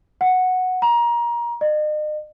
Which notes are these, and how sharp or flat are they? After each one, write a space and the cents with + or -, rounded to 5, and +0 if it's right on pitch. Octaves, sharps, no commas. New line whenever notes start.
F#5 -5
A#5 +25
D#5 -40